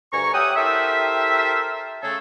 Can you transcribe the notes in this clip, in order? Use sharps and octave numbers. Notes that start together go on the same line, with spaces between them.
D2 G2 A#4 G#5 A#5 C#6
G4 C#5 E5 F#5 G5 D#6
E4 G4 A4 A#4 C5 E5
C#3 A3 G#4 A4